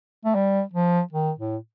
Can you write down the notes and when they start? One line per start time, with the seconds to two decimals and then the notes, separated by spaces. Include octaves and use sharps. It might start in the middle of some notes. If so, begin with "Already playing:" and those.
0.25 A3
0.35 G3
0.74 F3
1.13 D#3
1.38 A2